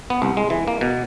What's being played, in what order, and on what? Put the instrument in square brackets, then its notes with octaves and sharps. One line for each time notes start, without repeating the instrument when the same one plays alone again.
[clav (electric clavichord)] B3
C2
G#3
E3
A#3
B2